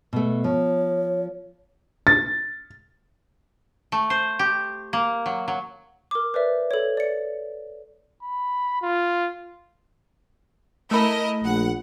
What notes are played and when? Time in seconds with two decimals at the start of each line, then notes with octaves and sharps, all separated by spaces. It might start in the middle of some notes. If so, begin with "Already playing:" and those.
0.13 B2 A3
0.44 F3 C#5
2.07 A6
3.92 A3
4.10 C5
4.39 G4
4.93 A#3
5.26 F#3
5.48 F#3
6.11 A#4 D6
6.34 B4 C5 D5 E5
6.71 A4 C#5
6.97 D5 C#7
8.23 B5
8.82 F4
10.91 A3 E4 A#4 D#5 B5
11.44 A#1 F#5